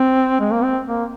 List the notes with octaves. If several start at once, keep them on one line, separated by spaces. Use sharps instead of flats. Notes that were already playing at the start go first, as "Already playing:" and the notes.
Already playing: C4
G#3
A#3
C4
A#3